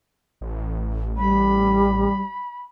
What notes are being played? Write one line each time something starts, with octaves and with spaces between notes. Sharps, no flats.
A1
G3 B5